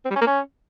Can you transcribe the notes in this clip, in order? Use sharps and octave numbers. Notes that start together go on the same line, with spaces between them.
C4
G3
C#4
A#3
C#4